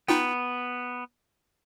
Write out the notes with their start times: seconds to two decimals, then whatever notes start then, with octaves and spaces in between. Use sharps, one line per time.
0.08 B3 D#4 F4 G5